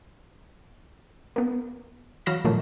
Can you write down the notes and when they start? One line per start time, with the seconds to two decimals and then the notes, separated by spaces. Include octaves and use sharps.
1.36 A#3 B3
2.26 E3 F#3 F5 B5 A#6 E7
2.44 A#2 D#3 F3 F#3 A3 A#3